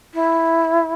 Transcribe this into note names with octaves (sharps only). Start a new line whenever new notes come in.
E4